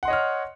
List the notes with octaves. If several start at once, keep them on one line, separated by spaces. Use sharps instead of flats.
C#5 D#5 F#5 C6 F6